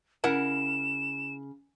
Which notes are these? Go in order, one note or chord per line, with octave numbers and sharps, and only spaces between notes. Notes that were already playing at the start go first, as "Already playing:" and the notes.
C#3 E4 A#4 F#5 E7